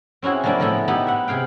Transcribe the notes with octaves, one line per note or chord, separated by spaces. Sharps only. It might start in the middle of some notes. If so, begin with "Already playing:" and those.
C4 C#4 E4 F#4 G#4
F3 F#3 A#3 D4 E4
A2 F3 B3 E4
B3 D#4 E4 G4
E5 F#5
C3 G#4 F5 G5